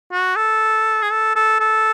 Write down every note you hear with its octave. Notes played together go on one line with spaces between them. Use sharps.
F#4
A4
G#4
A4
A4
A4